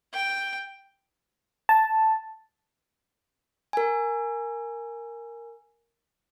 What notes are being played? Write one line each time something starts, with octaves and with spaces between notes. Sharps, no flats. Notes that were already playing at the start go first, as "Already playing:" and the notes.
G5
A5
A#4 G#5